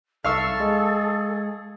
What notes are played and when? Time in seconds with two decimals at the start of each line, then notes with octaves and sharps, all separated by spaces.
0.24 C2 D#4 A4 E5 F5 C#6 E6
0.60 G#3 G#4